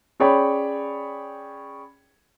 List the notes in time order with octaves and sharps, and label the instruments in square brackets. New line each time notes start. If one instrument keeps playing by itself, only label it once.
[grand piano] C#4 G#4 C#5 D5 G5 B5